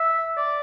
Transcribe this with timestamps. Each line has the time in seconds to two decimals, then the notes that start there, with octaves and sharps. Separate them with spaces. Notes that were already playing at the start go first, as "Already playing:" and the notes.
Already playing: E5
0.37 D5